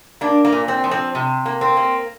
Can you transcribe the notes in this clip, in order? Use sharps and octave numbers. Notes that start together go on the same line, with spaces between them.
A#3 D4
A#3
A#2
C4
F3
C4
C3
A#3
C4
A#3